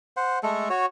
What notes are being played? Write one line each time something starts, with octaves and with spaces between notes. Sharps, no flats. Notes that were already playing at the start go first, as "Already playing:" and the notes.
C5 F#5
G#3 A3 A4
F#4 C#5